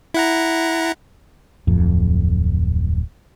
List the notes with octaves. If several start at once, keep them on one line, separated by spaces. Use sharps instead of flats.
E4 F#5 A#5
D1 F2